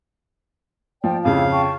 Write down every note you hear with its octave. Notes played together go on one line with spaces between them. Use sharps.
F3 D5 G5
F2 C#3 E4 F4 G4 F5
G5 A5 C#6